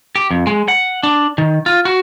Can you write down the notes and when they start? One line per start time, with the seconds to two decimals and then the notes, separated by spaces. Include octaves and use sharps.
0.16 G4
0.31 F2
0.47 G#3
0.68 F#5
1.03 D4
1.38 D#3
1.66 F4
1.85 F#4